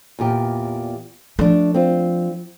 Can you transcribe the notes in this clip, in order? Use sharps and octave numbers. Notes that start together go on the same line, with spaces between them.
E2 A#2 G4
F3 A3 D4
C4 F4